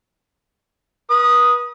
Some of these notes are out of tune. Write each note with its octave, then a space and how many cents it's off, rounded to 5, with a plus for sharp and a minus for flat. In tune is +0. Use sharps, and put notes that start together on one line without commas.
B4 -40 D#6 +0